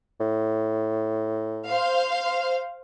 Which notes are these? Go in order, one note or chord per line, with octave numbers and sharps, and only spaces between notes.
A2
C5 F5